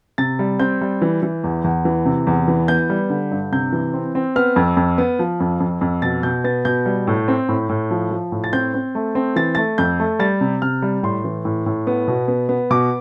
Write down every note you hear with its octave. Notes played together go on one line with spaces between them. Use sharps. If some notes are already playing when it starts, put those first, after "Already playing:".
C3 A6
G3
C4 G6
G3
E3
E3
E2
E2
E3
C3
E2
E3
B3 G6
G3
D3
G2
C3 G6
E3
C4
C4
B3 F6
F2
F2
B3
F3
F2
F2
F2
B2 A6
B2 G6
B3 A6
B2 G6
G3
A2
C4
A2
A2
F3
F3
A2
A6
C4 G6
C4
A3
C4
E3 A6
A3 A6
F2 G6
A3
G3 A6
C3
C3 F6
G3
A2 C6
E3
A2
A2
B3
B2
B3
B3
B2 D6